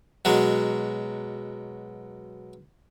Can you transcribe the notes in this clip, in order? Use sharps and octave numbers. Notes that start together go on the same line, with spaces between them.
B2 F#3 G#3